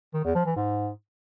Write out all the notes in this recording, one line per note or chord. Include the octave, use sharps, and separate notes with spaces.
D#3
E2
F3
E3
G#2